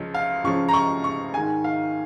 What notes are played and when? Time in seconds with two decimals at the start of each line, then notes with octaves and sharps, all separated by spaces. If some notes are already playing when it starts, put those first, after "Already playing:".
Already playing: C#2 C#3 F3 G#3 C#4
0.14 F5
0.44 C#2 C#3 F3 G#3 C#4 C#6
0.68 A#5
0.73 C#6
1.04 C#6
1.34 G#2 D#3 G#3 G#5
1.64 F5